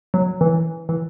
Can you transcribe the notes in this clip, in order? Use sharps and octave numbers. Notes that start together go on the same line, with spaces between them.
F#3
E3
E3